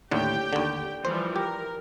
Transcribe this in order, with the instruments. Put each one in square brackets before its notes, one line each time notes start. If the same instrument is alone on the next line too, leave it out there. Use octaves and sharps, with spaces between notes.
[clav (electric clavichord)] D#2 A2 D3 [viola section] G4 G5
[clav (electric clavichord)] D#2 D3
[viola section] E3 F3 G3 [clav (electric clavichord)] C5
[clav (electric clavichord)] G4 [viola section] A#4